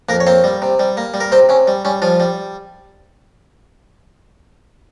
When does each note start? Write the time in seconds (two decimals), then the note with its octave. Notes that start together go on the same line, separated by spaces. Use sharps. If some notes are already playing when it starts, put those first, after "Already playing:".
0.09 F2 A#3 A#4
0.20 C#5
0.27 A#3 C4 C5
0.44 G3
0.62 C3
0.79 G3
0.97 A#3
1.14 G3
1.20 A#4
1.32 C3 C4 C5
1.49 C3 C#4
1.68 G3
1.85 G3 C#4
2.02 F3 G3 F4
2.20 G3